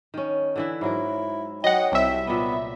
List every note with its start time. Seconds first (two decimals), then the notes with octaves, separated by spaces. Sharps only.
0.14 D#3 C#4
0.56 D3 E3 E4
0.81 G#2 F#3 E4 A#4
1.64 F#3 D#5 F#5 G5
1.92 C2 E5
2.27 A#2 B3 D#5